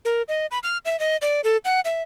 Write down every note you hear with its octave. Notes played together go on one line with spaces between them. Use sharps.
A#4
D#5
B5
F6
E5
D#5
D5
A4
F#5
E5